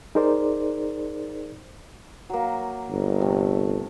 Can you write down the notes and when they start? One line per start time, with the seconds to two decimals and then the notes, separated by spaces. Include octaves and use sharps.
0.15 D#4 G#4 A#4 C5 D5
2.30 F#3 A#3
2.90 G1
3.21 C3 A3